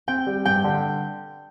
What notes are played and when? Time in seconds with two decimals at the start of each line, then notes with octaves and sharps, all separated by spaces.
0.08 C4 G5
0.27 G3
0.45 G2 G5
0.64 D3